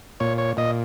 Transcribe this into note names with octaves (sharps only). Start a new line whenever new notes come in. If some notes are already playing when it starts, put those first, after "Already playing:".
A#2 C#5
C#5
A#2 D#5